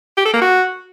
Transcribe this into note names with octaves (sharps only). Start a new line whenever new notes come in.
G4
A4
A#3
F#4